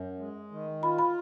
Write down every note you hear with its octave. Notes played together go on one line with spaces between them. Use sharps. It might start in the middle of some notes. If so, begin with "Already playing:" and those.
Already playing: F#2
G#3
D#3
F4 B5
B5